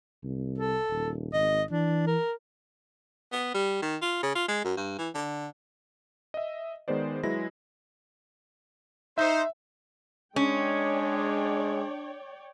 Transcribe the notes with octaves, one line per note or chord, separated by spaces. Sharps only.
C2
A4
D#1
G#1 D#5
E3 D4
A#4
B3
G3
D#3
F4
C#3
F4
G#3
F#2
G2
E3
D3
D#5 E5
D#3 G#3 B3 C5 D5
F#3 G#3 E4 B4 A#6
D#4 C5 E5
G#3 C#4 D4 C#5 D5 G5